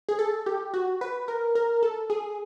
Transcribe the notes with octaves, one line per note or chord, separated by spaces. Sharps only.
G#4
A4
G4
F#4
B4
A#4
A#4
A4
G#4